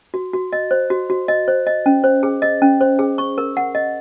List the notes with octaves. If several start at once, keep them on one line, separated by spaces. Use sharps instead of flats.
F#4
F#4
D#5
C5
F#4
F#4
D#5
C5
D#5
C#4
C5
G#4
D#5
C#4
C5
G#4
C#6
A#4
F#5
D#5